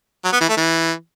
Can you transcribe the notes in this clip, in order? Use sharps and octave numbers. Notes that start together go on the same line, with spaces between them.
F#3
B3
E3
A3
E3